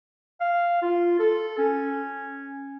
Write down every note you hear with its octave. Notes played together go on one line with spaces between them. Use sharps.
F5
F4
A4
C#4